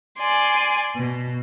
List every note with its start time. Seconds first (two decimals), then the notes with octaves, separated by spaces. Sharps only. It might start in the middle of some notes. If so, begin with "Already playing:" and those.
0.19 D5 G#5 C6
0.95 B2